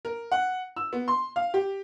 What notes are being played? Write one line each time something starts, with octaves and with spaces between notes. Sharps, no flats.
A#4
F#5
E6
B3
C6
F5
G4